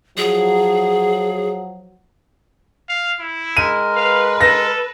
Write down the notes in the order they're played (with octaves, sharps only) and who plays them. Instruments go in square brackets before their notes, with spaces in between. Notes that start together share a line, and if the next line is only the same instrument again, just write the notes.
[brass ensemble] F3 F#3 [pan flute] G#4
[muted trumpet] F5
E4
[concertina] G#3 A#4 [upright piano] D#7
[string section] B4 [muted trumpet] F5
[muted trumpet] A4 [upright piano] A#6